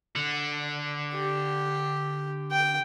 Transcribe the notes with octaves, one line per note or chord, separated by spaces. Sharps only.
D3
G4
G5